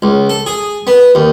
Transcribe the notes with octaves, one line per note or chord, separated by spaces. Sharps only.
C#2
A4
G#4
B3
D#2